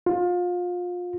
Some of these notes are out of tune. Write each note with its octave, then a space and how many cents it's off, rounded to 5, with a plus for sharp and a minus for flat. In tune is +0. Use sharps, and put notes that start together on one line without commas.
F4 +30